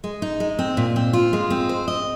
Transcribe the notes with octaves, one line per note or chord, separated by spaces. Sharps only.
G#3
D#4
G#3
C4
A#2
C4
F4
G#3
C4
C5
D#5